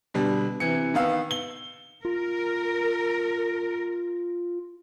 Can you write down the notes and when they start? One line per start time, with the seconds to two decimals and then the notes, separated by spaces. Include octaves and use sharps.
0.14 B2 D3 G3
0.60 C3 E3 C#7
0.94 D#3 B3 F5 E6
1.31 G7
2.05 F4 A#4